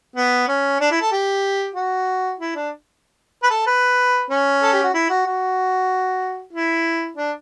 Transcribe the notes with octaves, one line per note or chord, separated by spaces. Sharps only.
B3
C#4
D4
E4
A4
G4
F#4
E4
D4
B4
A4
B4
C#4
A4
G4
F#4
E4
F#4
F#4
E4
D4